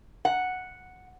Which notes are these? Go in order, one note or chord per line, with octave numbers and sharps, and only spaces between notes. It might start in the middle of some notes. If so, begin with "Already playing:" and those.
F#5